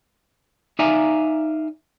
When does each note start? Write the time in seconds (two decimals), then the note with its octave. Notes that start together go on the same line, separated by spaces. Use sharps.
0.79 D#4 D5 E5 F5 G#5 A#5